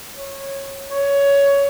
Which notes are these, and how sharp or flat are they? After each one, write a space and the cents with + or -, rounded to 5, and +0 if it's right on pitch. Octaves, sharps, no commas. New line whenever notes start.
C#5 -15
C#5 +15